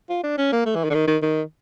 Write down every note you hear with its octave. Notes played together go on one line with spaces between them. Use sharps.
F4
D4
C#4
A#3
A3
E3
D#3
D3
D#3
D#3
D#3